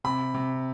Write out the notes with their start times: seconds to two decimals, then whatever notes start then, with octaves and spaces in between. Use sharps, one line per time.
0.04 C3 B5
0.34 C3